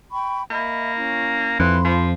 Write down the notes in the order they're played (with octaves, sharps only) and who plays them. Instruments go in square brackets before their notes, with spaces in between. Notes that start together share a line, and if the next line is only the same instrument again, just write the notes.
[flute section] G5 B5 C#6
[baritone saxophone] A#3 [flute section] D#5 E5 B5
[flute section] C#4 E4
[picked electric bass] F2 [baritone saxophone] E3 [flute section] B5 C6
[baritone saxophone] F3